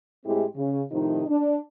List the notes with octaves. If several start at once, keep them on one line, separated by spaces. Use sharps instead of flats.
A2 G#3 C4 E4 G4 G#4
C#3
A2 C3 D#3 F3 D#4
D4